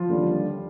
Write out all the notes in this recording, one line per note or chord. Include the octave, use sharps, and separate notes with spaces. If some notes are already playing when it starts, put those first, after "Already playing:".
Already playing: F3 F4
D#2 D3 G3